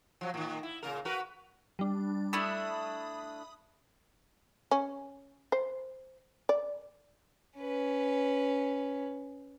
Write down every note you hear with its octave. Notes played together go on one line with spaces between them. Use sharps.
F3 F#3
A2 D#3
E4
A#2 C#3 A#4
F#4 A#4 B4
G3 D4
A3 D4 E4 B5 D#6
C#4
C5
D5
C#4 B4